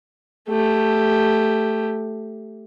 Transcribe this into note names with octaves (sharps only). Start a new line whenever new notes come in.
A3 G4